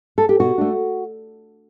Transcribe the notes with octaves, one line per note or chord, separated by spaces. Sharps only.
A4
G4
B2 F#4
A3 D4